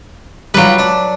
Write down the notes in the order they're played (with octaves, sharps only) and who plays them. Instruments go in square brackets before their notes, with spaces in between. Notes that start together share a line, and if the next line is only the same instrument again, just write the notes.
[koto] F#3 B4 [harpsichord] G3 F4
[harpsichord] D4